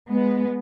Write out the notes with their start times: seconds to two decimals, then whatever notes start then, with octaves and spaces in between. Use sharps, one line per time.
0.12 G#3 B3